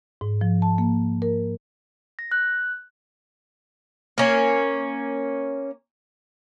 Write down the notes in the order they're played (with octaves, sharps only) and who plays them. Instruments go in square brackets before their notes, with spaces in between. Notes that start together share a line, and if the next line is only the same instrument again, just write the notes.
[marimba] G#2
F3
A5
A#3
A#4
[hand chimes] A#6
F#6
[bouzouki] A#3 C#4